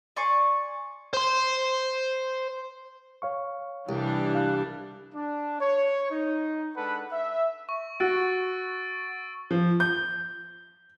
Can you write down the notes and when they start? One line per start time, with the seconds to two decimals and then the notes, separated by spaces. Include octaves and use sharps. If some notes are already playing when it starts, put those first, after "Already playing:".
0.16 D5 G#5 C6 C#6
1.13 C5 C6
3.22 C#5 F5 C#6
3.89 C2 E3 G3 D4
4.35 F5 F#6
5.14 D4
5.60 C#5
6.10 D#4
6.76 G#3 D4 A4 B4 F#5 B5
7.11 E5
7.69 C#6
8.00 F#4 E6 A6 D7
9.51 F3
9.80 G6